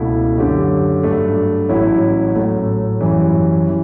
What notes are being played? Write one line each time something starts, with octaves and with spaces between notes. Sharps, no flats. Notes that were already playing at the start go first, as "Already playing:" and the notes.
Already playing: C#2 B2 A3 E4
F#2 D3 A3 C#4 G4
G2 F#3 A3 D4
A1 A2 F#3 C#4 E4
A2 F#3 A3
F#2 E3 G3 C#4
E3